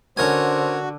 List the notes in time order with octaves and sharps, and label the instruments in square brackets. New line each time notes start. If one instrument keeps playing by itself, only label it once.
[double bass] D3 [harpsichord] C#4 A#4 G#5 [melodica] F#4 [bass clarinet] C5